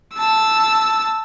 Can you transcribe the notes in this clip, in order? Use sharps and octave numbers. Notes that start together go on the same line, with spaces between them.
A5 E6